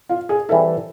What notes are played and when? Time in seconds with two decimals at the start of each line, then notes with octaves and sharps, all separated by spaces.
0.09 F4
0.29 G#4
0.49 E3 G3 C4 E4 A4